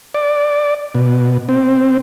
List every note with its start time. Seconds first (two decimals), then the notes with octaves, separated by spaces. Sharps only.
0.14 D5
0.95 B2
1.49 C4